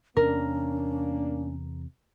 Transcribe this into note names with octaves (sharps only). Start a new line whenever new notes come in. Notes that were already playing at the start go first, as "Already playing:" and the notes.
E2 C3 A#3 B3 C#4 D4 A#4